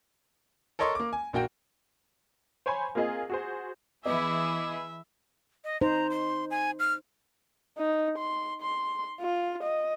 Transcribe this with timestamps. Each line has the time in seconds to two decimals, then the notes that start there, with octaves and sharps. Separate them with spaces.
0.79 A4 A#4 C#5 D#5 C6 C#6
0.95 A#3 D6
1.13 G#5
1.33 A#1 A#3 F#4 G5
2.66 C5 C#5 G#5 B5 C6
2.95 A#3 C4 F4 G#4 D#5
3.30 F#4 G#4 C5
4.05 E3 B3 E4 G#4 D#5 E5 D6
5.64 D#5
5.81 D#4 C5 A#5
6.10 C6
6.51 G#5
6.79 F6
7.78 D#4
8.18 C6
8.62 C6
9.21 F4
9.63 D#5